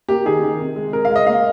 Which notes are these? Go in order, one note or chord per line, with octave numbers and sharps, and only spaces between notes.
A#3 G4
D#3 G#4
D#3
C3
G#3
G#3 A#4
G#3 F5
D#5
A#3 F5